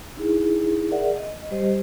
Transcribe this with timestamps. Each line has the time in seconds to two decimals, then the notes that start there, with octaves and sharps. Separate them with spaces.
0.17 D#4 E4 G#4
0.91 G#4 A#4 D5 E5 F#5
1.16 D#5
1.51 G3 G4 C5 D#5